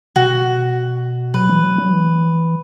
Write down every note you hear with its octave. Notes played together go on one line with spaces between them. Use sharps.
B2 F#4
F#3 B4
E3
F#3
F#3
E3